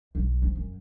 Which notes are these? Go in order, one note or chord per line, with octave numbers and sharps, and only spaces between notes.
B1
D2
F#2